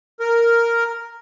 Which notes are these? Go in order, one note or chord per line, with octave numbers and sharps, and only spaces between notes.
A#4